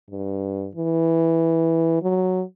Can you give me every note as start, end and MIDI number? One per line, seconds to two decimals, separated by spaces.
0.10 0.68 43
0.76 1.98 52
2.03 2.43 54